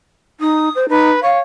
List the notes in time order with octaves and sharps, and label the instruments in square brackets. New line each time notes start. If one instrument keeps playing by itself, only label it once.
[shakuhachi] D#4 [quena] D#6
[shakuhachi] C5
[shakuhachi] D#4 [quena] B4
[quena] C#5 [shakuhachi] F5